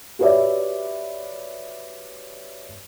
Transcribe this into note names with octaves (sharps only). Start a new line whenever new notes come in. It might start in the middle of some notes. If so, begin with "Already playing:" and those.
F#4 G4 B4 C#5 D5 E5